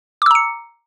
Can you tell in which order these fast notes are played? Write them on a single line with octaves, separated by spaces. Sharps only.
D6 E6 A#5 C#7